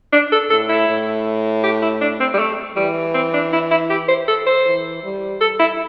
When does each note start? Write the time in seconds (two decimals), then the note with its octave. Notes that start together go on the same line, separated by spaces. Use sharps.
0.13 D4
0.32 A4
0.50 A2 A4
0.69 E4
0.88 A2
1.63 G4
1.82 E4
2.01 D4
2.20 C4
2.34 G3
2.39 A3
2.76 E3 G3
3.15 C4
3.34 D4
3.53 E4
3.71 E4
3.90 G4
4.09 C5
4.28 A4
4.47 C5
4.66 E3
5.03 G3
5.41 A4
5.60 E4